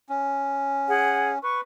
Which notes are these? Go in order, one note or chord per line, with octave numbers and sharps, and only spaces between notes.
C#4
G#4 F#5
B4 C#6